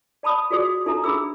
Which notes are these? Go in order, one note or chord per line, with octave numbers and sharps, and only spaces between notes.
D5 A5 B5 D#6
F#4 G#4 D5 D#6
D#4 A4 E5 A#5
D4 G#4 B5 E6